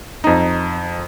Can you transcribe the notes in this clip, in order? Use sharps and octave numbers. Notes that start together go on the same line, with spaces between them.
F2 D#4